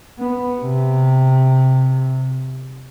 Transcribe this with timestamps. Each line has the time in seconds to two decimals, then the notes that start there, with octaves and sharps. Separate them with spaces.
0.19 B3
0.61 C3